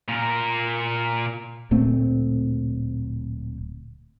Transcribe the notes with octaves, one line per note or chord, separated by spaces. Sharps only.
A#2 A#4
D1 A#2 A3 C4